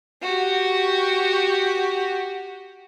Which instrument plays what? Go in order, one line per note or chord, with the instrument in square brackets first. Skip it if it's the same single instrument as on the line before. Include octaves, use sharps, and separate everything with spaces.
[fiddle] F#4 G4